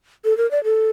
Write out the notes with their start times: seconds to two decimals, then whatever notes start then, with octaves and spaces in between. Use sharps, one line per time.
0.25 A4
0.37 A#4
0.51 D5
0.64 A4